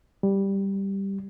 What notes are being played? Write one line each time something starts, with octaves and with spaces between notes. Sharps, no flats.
G3